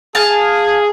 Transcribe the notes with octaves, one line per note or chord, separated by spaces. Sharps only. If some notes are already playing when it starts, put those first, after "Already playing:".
G#4 F5 G#5 A5